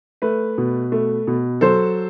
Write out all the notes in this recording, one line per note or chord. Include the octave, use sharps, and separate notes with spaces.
A3 B4
B2
A3
B2
F#3 A4 C5